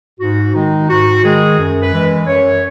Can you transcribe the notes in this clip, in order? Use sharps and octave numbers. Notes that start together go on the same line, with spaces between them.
G#2 F#4
D#3 G#3 D#4
G#2 F#4
D#3 G#3 G#4
F#2
B4
E3 G#3
F#2 C#5